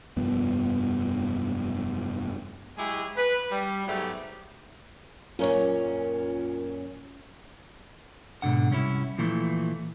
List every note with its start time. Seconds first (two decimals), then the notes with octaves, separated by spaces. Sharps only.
0.17 F1 G2 F3 B3
2.78 F#3 G#3 E4 G4 G#4
3.17 B4
3.51 G3
3.87 G#2 F#3 A3 B3 G4
5.39 F#2 A#2 C#4 F4 A#4 C#5
8.42 G#2 B2 D3 F#5
8.70 C2 C#4 E4
9.18 A#2 E3 F3 A3